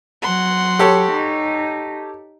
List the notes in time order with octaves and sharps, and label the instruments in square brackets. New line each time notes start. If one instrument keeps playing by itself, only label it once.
[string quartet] F#3 F#5 C6
[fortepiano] G4 A4 C#5
[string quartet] D#4